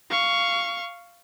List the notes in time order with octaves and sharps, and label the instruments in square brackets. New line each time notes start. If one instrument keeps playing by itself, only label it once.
[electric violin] F5 C#6